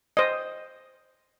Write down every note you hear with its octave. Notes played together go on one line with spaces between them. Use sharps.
C5 D#5